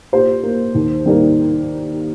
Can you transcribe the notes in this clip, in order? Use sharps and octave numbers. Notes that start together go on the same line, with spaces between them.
A#2 G4 C5
A#3
D#2
D#3 G3 A#3